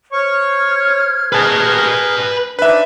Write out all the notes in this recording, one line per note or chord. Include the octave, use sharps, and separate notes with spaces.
C5 C#5 C#6 F6 G#6
G#4 A#4 B4 A5
D4 D#4 B4 C5 E5